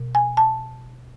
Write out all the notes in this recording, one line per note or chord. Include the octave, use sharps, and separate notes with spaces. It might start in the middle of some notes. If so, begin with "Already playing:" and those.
Already playing: B2
G#5
A5